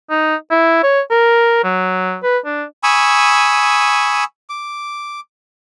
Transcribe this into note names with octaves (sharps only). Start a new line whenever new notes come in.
D#4
E4
C#5
A#4
F#3
B4
D4
G#5 B5 C#6 D#6 E6
D6